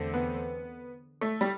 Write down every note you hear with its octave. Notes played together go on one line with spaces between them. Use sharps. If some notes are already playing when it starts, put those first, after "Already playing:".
Already playing: E2 D3 A3 C4
B3
A3
G3